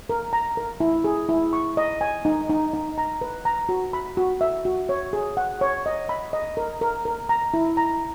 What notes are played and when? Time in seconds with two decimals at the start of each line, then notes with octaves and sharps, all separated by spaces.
0.10 A#4
0.33 A#5
0.57 A#4
0.80 E4
1.04 G#4
1.29 E4
1.53 C#6
1.77 D#5
2.01 G#5
2.25 D#4
2.50 D#4
2.73 D#4
2.98 A#5
3.21 B4
3.45 A#5
3.69 F#4
3.93 B5
4.17 F#4
4.41 E5
4.65 F#4
4.89 C#5
5.13 G#4
5.37 F#5
5.61 C#5
5.86 D#5
6.09 B5
6.33 D#5
6.57 A#4
6.81 A#4
7.05 A#4
7.29 A#5
7.54 E4
7.77 A#5